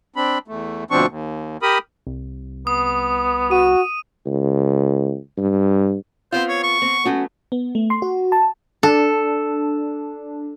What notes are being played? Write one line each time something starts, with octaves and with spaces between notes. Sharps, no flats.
C4 D4 B5
E2 A3
D2 B2 F3 C4 D4 C#6
D#2
G4 A#4 B5 D#6
C2
B3 D#6
F#4 D#7
C#2
G2
B3 C4 F4 C5
C#5
C#6
B3 C4
F#3 A3 B3 C#4 F#4
B3
A3
C6
F#4
A5
D4 A4